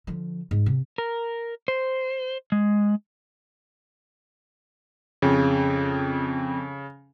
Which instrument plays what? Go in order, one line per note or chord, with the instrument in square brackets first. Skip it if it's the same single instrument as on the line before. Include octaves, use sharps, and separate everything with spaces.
[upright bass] D3 F3
G#2
C3
[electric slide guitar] A#4
C5
G#3
[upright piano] F2 [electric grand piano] C#3